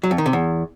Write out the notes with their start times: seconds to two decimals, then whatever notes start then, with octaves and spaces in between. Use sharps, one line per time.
0.03 F#3
0.11 F2
0.18 D#3
0.26 C3
0.33 E2